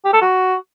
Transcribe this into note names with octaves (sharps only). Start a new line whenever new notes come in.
G4
A4
F#4